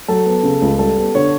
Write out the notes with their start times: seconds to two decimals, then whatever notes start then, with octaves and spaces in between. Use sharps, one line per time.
0.08 F#3 A4
0.26 B3
0.43 C#3
0.62 C#2
0.79 G3 A4
0.96 B3
1.15 D3 C#5